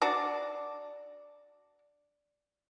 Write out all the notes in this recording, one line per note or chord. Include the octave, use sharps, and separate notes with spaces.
D4 F#4 D5